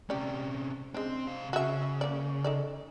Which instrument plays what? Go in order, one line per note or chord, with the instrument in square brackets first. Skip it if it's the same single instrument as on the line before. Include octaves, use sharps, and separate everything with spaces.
[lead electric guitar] C3 C#4 [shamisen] G4 D5
[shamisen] G#3 D4 [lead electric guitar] C4
[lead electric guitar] C3 F5
[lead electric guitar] C#3 [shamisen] F#4 E5
[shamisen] A#3 D5
D#4 A4 D5